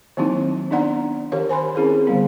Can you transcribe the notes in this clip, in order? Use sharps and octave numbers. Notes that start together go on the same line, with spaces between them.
D#3 F#3 A#3 C4 D#4 E4
B3 D4 D#4 D5 F#5 A#5
D#3 G4 A#4 C#5
C5 G#5 B5 C6
C4 C#4 E4 G#4 A#4
D3 G3 B3